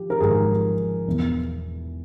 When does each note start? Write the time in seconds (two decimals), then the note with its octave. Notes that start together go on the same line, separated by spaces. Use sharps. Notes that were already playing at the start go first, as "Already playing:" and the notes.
Already playing: F3 G4
0.10 A#4
0.20 G#1 G#2 F3 G#4
1.07 E1 E2 E3